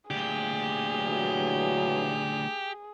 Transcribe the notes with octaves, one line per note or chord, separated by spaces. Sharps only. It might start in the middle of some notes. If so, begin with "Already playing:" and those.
D2 A#2 G4 G#4
G2 E3 F#3